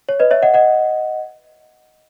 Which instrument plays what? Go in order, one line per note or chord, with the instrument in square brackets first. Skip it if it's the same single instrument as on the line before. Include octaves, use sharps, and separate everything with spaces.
[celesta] C#5
B4 D#5
C#5 E5
D#5 F#5
D#5 F#5